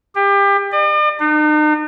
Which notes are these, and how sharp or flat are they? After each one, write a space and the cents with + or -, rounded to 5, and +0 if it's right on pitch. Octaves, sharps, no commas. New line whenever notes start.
G4 +30
D5 +45
D#4 -40